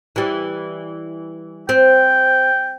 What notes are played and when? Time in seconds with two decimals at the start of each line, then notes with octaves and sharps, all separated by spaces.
0.16 E3 G3
1.69 C4 G5